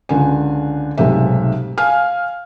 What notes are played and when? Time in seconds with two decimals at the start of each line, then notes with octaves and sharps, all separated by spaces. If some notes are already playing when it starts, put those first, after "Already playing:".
0.09 C#2 D3 G#5
0.98 B1 G#2 C3 A3 E5
1.78 F5 G#5 F6